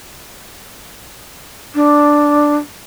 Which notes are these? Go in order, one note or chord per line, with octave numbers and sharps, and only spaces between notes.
D4